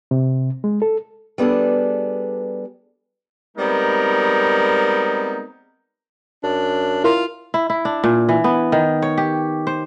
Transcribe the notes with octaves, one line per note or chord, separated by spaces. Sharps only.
C3
G#3
A4
G3 B3 D4 G#4 A4
G3 G#3 B3 C4 D#4 A#4
F#2 D4
E4 F4 A#4 C6
E4
E4
D4
A#2
E3
B3
D#3
C#5
G4
C5